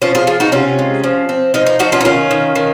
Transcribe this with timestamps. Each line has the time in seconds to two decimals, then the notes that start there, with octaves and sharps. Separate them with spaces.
0.02 F3 C#4 F4
0.15 F4 G#4
0.27 F3 F4 G#4
0.40 D#4 F#4
0.52 C3 C#4 F4
0.79 G#3
1.04 F3
1.29 C4
1.54 F3 D#4
1.66 D#4
1.79 F3 D#4 F#4
1.92 C#4 F4
2.01 D#4
2.05 D#3 C#4 F4
2.31 D#3
2.56 D#3